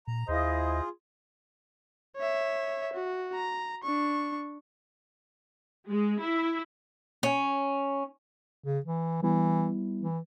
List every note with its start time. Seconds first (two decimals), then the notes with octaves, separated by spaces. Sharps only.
0.08 A#2 A#5
0.29 D#2 E4 F4 G#4 C5 D#5
2.17 C#5 E5
2.93 F#4
3.35 A#5
3.84 D4 C#6
5.90 G#3
6.21 E4
7.23 C#4
8.66 C#3
8.86 E3
9.23 E3 G3 B3 E4
10.01 E3